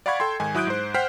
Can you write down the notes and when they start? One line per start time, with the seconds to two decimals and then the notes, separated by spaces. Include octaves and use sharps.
0.06 D5 F5 F#5 B5 C#6 G#6
0.20 A4 G5 C6
0.40 G#2 D#3 G#5
0.55 F#3 E4 D#6 F#6 G6 D7
0.67 G#2 C5
0.94 C5 F#5 G5 F6 B6 C7